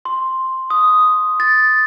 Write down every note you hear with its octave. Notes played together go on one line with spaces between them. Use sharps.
C6
D#6
A6